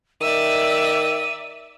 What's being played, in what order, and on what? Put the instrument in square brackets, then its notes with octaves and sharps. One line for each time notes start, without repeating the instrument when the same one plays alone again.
[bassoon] D#3 [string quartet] D5 E5 E6 [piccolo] D#7